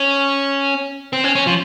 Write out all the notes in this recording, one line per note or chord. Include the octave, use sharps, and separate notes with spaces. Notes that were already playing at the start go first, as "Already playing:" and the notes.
Already playing: C#4
C4
C#4
C#4
F3